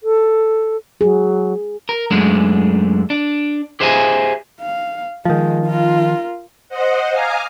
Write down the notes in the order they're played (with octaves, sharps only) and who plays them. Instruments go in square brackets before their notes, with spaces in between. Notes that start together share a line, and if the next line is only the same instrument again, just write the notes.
[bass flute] A4
[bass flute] F#3 [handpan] G#4
[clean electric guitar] A#4
F#2 G#3 A3 D4
D4
G4 G#4 C5 D#5 E5 G#5
[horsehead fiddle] F5
[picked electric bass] D#3 F3 [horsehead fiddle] G#3
[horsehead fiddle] F4 A#4
[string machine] C5 D#5 F#5
F5 G#5 A#5 D6 D#6 F6